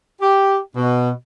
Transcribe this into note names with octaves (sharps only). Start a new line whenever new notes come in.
G4
B2